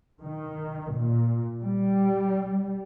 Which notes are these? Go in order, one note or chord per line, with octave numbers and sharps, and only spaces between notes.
D#3
A#2
G3